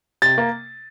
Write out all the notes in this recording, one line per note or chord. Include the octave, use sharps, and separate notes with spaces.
C3 A6
A#3